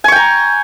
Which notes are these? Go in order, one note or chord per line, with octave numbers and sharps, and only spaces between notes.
G5 G#5 A#5 C#6